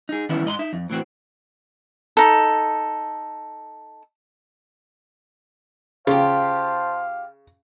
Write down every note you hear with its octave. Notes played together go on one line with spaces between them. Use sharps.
D#4 G#4
D#3 E3 G3 B3 C#4 E4
G#2 D#5 B5 C6
D#4 E5
F2
A2 E3 C4 F#4
D#4 A4
C#3 F4 G4 C5 F5 A5